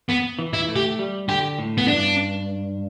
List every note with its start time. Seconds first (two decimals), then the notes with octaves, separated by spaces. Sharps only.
0.09 B3
0.39 E3
0.54 E4
0.68 A3
0.76 G4
0.99 G3
1.29 D3 G4
1.59 A2
1.78 B3
1.88 G2 D4